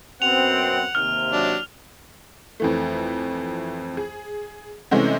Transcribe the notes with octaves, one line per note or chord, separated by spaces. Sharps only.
F#2 B3 C4 F#5 F7
D#2 C3 F6
F#3 D4
F2 E3 A3
G#4
C3 E3 G#3 A3 C4 C#4